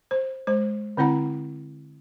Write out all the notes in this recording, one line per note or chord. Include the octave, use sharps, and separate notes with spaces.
C5
G#3 C5
D3 C4 E4 F#5 A#5